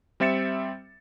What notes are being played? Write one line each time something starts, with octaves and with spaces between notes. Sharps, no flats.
G3 C4 E5 A6 C#7 E7